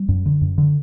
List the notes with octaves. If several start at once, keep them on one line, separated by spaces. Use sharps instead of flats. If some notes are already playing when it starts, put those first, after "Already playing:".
Already playing: G3
F#2
D3
F#2
D3